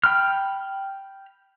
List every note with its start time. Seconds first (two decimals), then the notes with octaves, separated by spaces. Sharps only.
0.04 G5 B5 F6